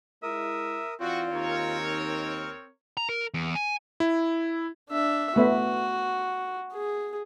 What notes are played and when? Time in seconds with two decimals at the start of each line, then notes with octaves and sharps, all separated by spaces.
0.23 G#3 E4 A#4 E5 D#6
1.00 E3 C4 F4 F#4 D5
1.31 D#2 D#3 A#4 C#5
1.84 F6
2.97 A#5
3.09 A#4
3.34 E2
3.55 G#5
4.00 E4
4.90 D4 E5
5.36 A3 B3 F#4 E5
6.73 G#4